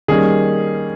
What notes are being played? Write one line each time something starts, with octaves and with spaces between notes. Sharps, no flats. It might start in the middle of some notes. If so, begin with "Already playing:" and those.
D#3 G3 A#3 C#4 G#4